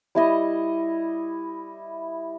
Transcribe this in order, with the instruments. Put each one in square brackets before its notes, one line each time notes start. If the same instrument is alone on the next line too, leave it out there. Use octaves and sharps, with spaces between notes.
[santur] G3 E4 D#5